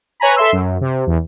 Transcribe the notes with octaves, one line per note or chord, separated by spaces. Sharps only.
B4 C#5 G#5 A#5 B5
A4 E5 C6 E6
F#2
C3
E2